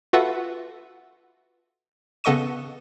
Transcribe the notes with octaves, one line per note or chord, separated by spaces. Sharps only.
F4 F#4 A4 B4 E5 F#5
C#3 B3 A4 D#5 C#6 D#7